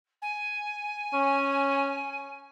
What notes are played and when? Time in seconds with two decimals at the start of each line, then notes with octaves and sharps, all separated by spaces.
0.22 G#5
1.14 C#4